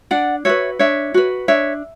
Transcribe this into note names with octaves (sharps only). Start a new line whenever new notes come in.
D4 D5 F#5
F#4 B4 C#5 E5
D4 C#5 E5
F#4 B4
D4 C#5 E5